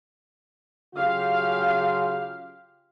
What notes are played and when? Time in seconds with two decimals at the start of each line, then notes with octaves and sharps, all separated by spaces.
0.96 C#3 F#3 F4 G4 F5